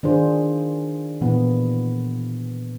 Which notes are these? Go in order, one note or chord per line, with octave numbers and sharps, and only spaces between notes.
D#3 D4 F4 G#4 C5
A#2 E3 A#3 B3